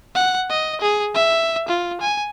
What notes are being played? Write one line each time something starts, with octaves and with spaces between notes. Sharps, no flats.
F#5
D#5
G#4
E5
F4
G#5